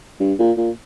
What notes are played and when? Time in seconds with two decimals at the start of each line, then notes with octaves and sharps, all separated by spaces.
0.20 G2
0.39 A#2
0.57 A#2